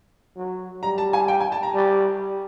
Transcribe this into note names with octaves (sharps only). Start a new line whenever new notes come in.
F#3
G3 A#5
A5
G#5
G5
G#5
A5
A#5
G3